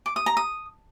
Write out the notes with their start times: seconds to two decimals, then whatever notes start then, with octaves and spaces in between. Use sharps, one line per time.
0.06 D6
0.16 D#6
0.26 A#5
0.37 D#6